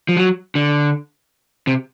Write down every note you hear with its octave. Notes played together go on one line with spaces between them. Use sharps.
F3
F#3
D3
C3